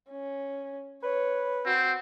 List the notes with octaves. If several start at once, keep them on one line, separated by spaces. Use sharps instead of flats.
C#4
B4 C#5
C4 F#4